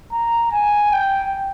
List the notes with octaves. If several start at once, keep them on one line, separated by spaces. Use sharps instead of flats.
A#5
G#5
G5